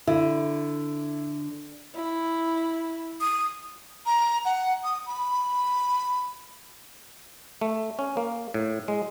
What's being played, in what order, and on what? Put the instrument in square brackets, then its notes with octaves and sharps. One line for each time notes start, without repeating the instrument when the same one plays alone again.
[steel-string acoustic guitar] D3 [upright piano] E4
[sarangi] E4
[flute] D#6
[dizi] A#5
F#5
D#6
B5
[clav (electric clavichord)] A3
C#4
A#3
A2
G#3